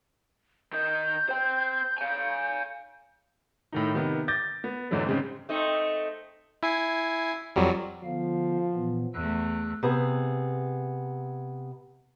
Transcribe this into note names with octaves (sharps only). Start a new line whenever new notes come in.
D#3 D#5 G6
C5 G5
F5 G#5
A2 D#3 D#4
C3 D#3 B3
D6 G6 A6 A#6
B3
E2 G#2 D3 E3 F#3 A3
G#2 C#3 C4
A3 C4 D#4
E4 G#5 C7
F2 F#3 G3
D3 F3 B3 F5
A#2 E3 B3
E2 A3 E6 F#6
C3 B3 G#4